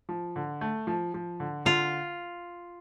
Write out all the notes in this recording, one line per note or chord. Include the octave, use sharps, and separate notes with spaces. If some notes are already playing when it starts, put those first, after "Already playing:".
F3
D3
A3
F3
F3
D3
D3 F4